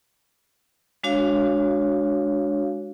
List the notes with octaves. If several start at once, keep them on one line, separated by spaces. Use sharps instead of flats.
G#3 D4 F#4 C#5 F5